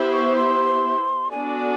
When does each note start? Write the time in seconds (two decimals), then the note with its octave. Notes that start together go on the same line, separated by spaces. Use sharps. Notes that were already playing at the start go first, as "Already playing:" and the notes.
Already playing: B3 E4 G4 C5
0.13 C#6
0.36 C6
1.31 B3 D4 F#4 A4 D5 G#5